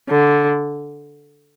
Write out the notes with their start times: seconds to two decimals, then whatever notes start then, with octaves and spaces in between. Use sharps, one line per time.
0.09 D3